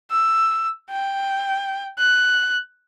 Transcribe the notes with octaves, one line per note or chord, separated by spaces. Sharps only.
E6
G5
F#6